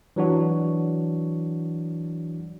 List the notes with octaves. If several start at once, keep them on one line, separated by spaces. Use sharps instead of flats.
E3 F#3 D4 F#4